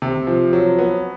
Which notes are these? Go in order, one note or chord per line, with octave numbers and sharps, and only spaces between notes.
C3
F3
F#3
B3